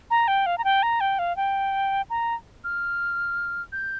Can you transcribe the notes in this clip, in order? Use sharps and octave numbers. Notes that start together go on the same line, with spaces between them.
A#5
G5
F5
A#5
G5
A#5
G5
F5
G5
A#5
F6
G6